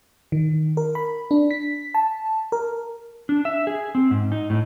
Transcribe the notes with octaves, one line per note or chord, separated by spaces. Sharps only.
D#3
A#4
B5
D4
B6
A5
A#4
D4
E5
G#4
C4
G#2
D#4
A2